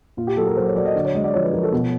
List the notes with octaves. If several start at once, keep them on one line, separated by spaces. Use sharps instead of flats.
A#2 F4
G4
F#3 A4
A#4
F#3 C5
C#5
F#3 D5
D#5
D3 D5
C#5
G#3 D#5
D5
F3 C#5
B4
F3 A#4
A4
B2